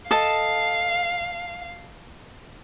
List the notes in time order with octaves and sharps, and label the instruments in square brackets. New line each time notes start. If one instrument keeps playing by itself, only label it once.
[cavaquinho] A4 D#5 A5 [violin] F5